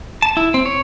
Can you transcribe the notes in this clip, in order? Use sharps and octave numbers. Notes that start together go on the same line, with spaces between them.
A5
E4
C4
C#5